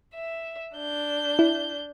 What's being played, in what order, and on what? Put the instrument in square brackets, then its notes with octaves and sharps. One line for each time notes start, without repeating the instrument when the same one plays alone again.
[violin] E5
D4 G6
[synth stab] E4